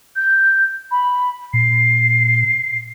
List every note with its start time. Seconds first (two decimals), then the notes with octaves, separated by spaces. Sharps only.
0.16 G6
0.91 B5
1.54 A#2 C7